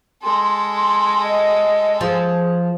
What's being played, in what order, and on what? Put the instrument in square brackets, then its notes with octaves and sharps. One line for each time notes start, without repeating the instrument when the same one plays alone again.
[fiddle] G#3 A4 [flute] C6
[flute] C6
D#5
[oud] F3 [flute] G#4